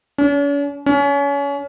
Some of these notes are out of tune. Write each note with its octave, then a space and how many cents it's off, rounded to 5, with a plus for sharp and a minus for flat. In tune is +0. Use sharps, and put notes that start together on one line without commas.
C#4 +45
C#4 +30